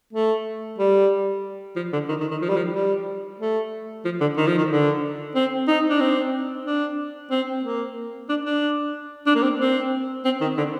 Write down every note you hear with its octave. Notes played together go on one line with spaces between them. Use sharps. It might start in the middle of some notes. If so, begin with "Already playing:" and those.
A3
G3
F3
D3
D#3
D#3
D#3
F3
G3
F3
G3
A3
F3
D3
D#3
F3
D#3
D3
C4
D#4
D4
C4
D4
C4
A#3
D4
D4
D4
A#3
C4
C4
C4
D#3
D3